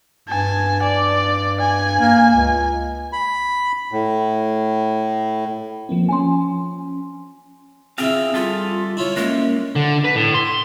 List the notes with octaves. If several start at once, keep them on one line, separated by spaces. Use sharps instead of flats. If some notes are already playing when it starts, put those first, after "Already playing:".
G2 G#5 A5
D5
G#5
A#3
C#2
B5
A2
F3 A#3 C4
F3 C#4 G#5 C6
C4 E4 F4 G#4 F5
G3 F4 A4 F5
E4 F4 C#5
G#3 A#3 C#4
D3
B4
A2
C6